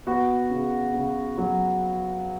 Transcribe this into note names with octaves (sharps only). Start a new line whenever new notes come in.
B3 F#4
C#3
C#3
F#3